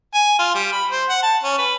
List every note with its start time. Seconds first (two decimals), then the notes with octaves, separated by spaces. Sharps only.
0.14 G#5
0.39 F4
0.54 G3
0.72 B5
0.91 C5
1.09 F#5
1.23 A5
1.43 C#4
1.58 B4